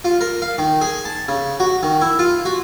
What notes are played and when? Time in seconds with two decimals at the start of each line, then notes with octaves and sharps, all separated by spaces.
0.05 F4
0.21 A#4
0.42 F5
0.58 D#3
0.81 G#4
1.05 A5
1.28 C#3
1.60 F#4
1.83 D#3
2.01 E4
2.19 F4
2.45 F#4